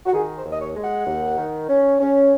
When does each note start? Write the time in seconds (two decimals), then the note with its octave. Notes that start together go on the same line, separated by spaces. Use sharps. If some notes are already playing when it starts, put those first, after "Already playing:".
0.06 F#4
0.13 D#3 G#4
0.37 C5
0.45 D#2
0.51 D#5
0.61 C#5
0.76 G#3
0.84 F#5
1.07 D#2
1.38 D#3
1.69 C#4
1.99 C#4